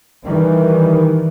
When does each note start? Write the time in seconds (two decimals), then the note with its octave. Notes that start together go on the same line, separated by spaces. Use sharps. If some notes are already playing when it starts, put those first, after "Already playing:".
0.25 D#3 E3 G3